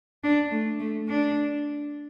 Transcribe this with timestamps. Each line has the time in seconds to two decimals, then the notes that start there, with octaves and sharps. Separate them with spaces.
0.24 D4
0.51 A3
0.79 A3
1.09 D4